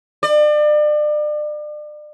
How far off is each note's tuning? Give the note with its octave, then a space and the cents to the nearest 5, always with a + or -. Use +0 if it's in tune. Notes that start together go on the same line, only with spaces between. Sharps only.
D5 +35